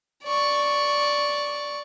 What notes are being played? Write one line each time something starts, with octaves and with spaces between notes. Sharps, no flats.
D5 C#6